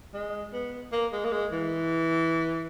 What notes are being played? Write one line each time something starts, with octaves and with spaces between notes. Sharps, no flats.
G#3
B3
A#3
G#3
A#3
G#3
E3